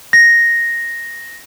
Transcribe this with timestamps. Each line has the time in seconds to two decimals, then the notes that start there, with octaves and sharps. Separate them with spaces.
0.13 A#6